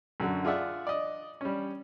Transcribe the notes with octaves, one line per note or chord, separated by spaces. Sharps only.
F#2 D3 F#4
F4 G#4 D5 E5 F#5
D5 D#5
G3 C#4